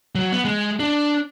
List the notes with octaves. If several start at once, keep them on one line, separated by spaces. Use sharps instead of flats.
F#3
B3
G#3
D4